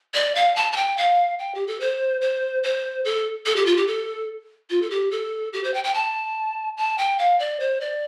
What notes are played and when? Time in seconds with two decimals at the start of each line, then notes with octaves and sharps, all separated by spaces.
0.14 D5
0.35 F5
0.56 A5
0.72 A5
0.76 G5
0.97 F5
1.39 G5
1.55 G4
1.67 A4
1.80 C5
2.21 C5
2.63 C5
3.05 A4
3.46 A4
3.56 G4
3.66 F4
3.77 G4
3.87 A4
4.70 F4
4.82 A4
4.90 G4
5.11 A4
5.53 G4
5.64 C5
5.74 G5
5.84 G5
5.94 A5
6.77 A5
6.98 G5
7.19 F5
7.39 D5
7.60 C5
7.81 D5